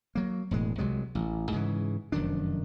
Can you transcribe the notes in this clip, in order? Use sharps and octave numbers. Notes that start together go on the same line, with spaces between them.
F#3 A#3
E1 A2 G#3
C2 C3 F#3 G#3
A1
G#2 C#3 E3
F1 F#2 D#3 D4